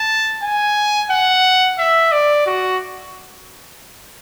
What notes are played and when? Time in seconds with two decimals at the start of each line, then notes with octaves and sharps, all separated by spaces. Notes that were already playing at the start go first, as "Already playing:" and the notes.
Already playing: A5
0.43 G#5
1.10 F#5
1.78 E5
2.12 D5
2.46 F#4